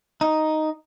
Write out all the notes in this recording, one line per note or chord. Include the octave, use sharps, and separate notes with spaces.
D#4